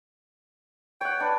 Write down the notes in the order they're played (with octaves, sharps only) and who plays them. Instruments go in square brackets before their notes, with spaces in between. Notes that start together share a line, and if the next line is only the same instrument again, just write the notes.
[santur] C#5 F#5 [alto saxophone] G5
[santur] D4 B4